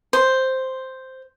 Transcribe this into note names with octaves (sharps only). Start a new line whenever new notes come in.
C5